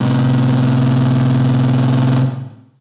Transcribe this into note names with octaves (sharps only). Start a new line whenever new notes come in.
A2 C3